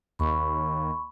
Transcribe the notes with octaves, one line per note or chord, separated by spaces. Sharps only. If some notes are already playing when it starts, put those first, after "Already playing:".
D#2 B5 C#6